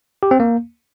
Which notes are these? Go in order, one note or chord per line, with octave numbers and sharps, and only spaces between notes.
G4
C4
A#3